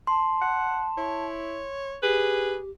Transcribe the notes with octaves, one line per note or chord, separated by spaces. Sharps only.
A5 C6
F#5
E4 C#5
G4 G#4 B4